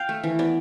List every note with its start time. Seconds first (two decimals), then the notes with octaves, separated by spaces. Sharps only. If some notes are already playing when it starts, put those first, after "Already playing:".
Already playing: F5 G5
0.09 A3
0.24 E3
0.39 B3 D5